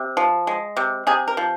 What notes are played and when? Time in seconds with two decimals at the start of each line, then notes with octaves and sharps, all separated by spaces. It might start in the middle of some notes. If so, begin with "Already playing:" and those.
Already playing: C3
0.17 F3
0.47 G#3
0.77 C3
1.07 C3 G#4
1.28 A#4
1.37 F3